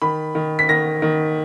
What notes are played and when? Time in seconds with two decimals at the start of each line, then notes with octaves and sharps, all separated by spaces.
0.02 D#3 B5
0.35 D#3
0.59 B6
0.69 D#3 A#6
1.02 D#3